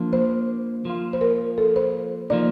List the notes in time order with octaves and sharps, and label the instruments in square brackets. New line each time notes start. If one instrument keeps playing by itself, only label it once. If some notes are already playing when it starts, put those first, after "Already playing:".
Already playing: [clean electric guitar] F3 A#3 D4
[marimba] C5
[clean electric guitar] F3 A#3 F4
[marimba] C5
A#4
A4
C5
[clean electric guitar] F3 A#3 D#4 [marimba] D5